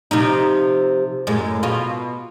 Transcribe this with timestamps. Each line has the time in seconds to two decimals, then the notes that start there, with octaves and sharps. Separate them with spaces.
0.11 C3 F3 D#4
1.27 F#2 A2 G#3
1.63 B2 F4